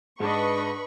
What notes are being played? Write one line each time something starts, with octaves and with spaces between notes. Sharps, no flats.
G#2 D4 B4 D#5 B5 C#6